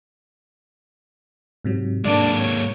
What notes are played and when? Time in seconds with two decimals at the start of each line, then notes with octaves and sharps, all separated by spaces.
1.64 G#2 C3 F#3
2.05 G#3 A#3 D4 D5
2.39 C#5